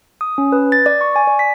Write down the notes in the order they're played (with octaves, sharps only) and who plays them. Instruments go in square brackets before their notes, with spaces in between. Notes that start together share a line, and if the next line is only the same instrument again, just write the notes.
[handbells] D#6
C#4
B4
A6
D5
C#6
G#5
D5
B6